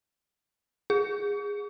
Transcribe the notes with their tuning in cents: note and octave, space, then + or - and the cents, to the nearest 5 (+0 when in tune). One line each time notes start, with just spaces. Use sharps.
G#4 -15